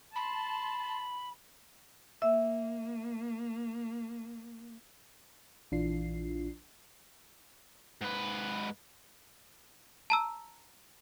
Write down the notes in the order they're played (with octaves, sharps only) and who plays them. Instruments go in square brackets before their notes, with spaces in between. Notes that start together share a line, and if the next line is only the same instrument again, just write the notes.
[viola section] A5 C6 [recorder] B5
[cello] A#3 [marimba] E5 E6
[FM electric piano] A#1 E3 D4 F4 C7
[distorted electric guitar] G#2 B4
[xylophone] A5 A#5 E6